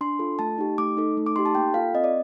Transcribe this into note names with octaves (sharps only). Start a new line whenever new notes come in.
D4 C6
F4 A4
A3 A5
D#4 G4
A3 D6
D#4 A4
A3
D6
D#4 G4 C6
A5
A#3 G5
F4 A4 F5
C4 D#5
D5